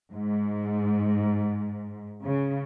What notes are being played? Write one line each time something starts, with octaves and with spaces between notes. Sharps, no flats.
G#2
C#3